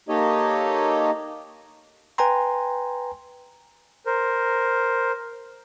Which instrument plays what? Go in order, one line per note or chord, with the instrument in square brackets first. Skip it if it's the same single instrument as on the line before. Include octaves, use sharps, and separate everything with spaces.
[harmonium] A#3 D#4 G4 A4 C#5 D#5
[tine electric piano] B4 G5 G#5 A#5 C6
[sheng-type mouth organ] A#4 C5